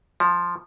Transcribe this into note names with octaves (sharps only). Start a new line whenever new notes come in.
F3